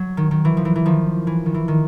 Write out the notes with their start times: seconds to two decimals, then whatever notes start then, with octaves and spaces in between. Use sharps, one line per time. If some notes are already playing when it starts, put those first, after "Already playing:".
Already playing: F#3
0.17 D#3
0.31 D#3
0.45 E3
0.57 F3
0.65 E3
0.76 E3
0.86 D#3 F3
1.27 E3
1.46 D#3
1.55 E3
1.68 D#3